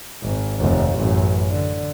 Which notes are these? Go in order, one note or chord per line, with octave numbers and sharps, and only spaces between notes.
G#1
F1 D#2
A1 F#2
D3